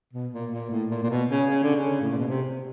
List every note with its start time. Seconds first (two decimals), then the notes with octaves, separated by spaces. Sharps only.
0.13 B2
0.33 A#2
0.52 A#2
0.71 A2
0.91 A#2
1.03 A#2
1.10 B2
1.30 C#3
1.49 C#3
1.63 D3
1.76 C#3
2.02 A2
2.10 A#2
2.18 B2
2.27 C3